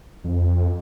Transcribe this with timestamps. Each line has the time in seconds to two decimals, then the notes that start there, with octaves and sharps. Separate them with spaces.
0.24 F2